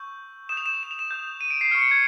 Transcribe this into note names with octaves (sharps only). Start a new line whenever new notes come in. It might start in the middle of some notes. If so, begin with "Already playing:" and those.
Already playing: C#6 E6 G6
D#6 G6 E7
F7
E7
F7
E7
F7
E7
D#6 G6
D#7
D7
C7
C#6 F6 C#7
C#7
G#6